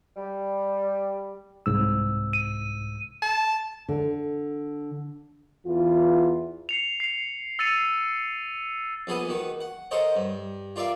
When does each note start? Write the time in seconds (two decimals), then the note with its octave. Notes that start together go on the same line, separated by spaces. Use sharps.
0.17 G3
1.66 C2 G#2 E6
2.33 D#7
3.22 A5
3.89 D3
5.65 E2 E3 F4
6.69 C7 C#7 F7
7.00 C7 F7
7.59 E6 A6 C7 C#7 D#7 F7
9.07 A#1 B3 G#4 A4 B4 D#6
9.29 D#3 F#4 B4
9.61 F#5
9.91 A4 A#4 C5 C#5 D#5 F#5
10.16 G2
10.76 F4 A#4 D5 E5 F5